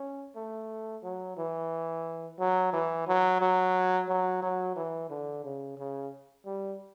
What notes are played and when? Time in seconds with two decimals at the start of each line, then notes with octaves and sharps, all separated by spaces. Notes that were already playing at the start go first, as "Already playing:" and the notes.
Already playing: C#4
0.36 A3
1.03 F#3
1.37 E3
2.39 F#3
2.73 E3
3.07 F#3
3.41 F#3
4.09 F#3
4.42 F#3
4.76 E3
5.10 D3
5.44 C#3
5.78 C#3
6.46 G3